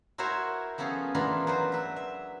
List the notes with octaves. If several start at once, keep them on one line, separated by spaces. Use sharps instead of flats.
E4 F#4 A#4 C5 C#5 E5
F3 B3 C#4 G#4 A4
E3 B3 D4 F4 A#4 B5
F#3 B4 C5
B4 E5
E5